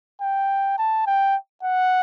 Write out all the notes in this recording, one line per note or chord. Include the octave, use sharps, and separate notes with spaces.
G5
A5
G5
F#5